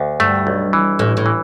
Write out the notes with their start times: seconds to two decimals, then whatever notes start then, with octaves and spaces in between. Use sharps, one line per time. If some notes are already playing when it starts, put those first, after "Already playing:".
Already playing: D2
0.20 G2 A3
0.47 B1
0.73 E3
0.99 A1 A2
1.17 A2
1.26 E3